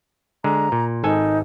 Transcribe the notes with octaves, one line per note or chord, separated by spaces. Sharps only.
D3 G#3 A#5
A#2
G#1 D#4 A4 G#5